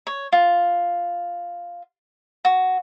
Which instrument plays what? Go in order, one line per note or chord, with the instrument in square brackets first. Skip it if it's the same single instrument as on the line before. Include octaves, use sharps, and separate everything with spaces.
[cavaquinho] C#5
F4
F#4